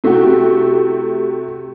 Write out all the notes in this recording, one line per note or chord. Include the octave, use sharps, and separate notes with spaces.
C3 A3 E4 F#4 G4